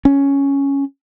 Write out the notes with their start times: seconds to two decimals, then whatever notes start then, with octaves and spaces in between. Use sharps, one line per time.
0.05 C#4